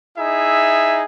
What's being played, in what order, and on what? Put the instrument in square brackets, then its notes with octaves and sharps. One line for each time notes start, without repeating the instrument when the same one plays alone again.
[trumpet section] D#4 E4 G#4 E5